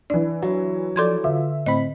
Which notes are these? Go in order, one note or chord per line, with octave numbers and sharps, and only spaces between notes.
E3 D4 D5
F#3
F3 A4 D5 C6 G#6
D3 F4 E5
A2 C4 D#5 B5